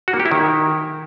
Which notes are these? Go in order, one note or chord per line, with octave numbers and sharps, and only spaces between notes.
F#4
A#3
G4
E4
D#3